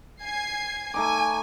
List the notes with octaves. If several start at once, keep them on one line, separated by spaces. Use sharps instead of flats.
G#5 G#6 C7
A3 D#4 G#5 D6